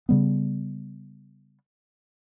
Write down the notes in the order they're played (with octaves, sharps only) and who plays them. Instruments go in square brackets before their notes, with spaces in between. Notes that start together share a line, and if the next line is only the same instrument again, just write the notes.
[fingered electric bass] C#3 G3 B3